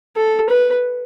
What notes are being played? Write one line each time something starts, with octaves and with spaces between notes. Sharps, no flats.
A4
B4